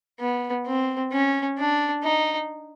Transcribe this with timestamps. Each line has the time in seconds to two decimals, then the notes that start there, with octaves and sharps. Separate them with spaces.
0.20 B3
0.67 C4
1.12 C#4
1.58 D4
2.03 D#4